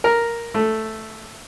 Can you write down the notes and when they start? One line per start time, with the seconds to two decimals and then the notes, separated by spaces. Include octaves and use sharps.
0.04 A#4
0.54 A3